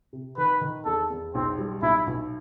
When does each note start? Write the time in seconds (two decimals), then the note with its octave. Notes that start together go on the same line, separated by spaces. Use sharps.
0.13 C3
0.38 D#3 B4
0.61 D#3
0.85 E2 A4
1.10 E2
1.35 B1 C4
1.58 G3
1.82 B1 E4
2.07 B1